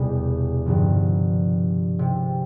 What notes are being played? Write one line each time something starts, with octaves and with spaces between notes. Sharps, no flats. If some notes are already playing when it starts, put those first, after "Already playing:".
Already playing: E1 E2 C3 G3
G1 G2 F3
C3